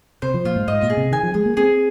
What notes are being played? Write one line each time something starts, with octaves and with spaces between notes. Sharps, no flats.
C3 C5
F3
A#2 F4
G#2
G#2 D#5
A#2
G#4
C3
D#3 G#5
F3
G#3 G#4
A#3
C4 G#4